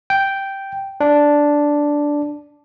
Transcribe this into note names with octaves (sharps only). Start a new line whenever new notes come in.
G5
D4